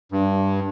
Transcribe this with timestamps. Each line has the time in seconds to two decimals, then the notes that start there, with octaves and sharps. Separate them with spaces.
0.12 G2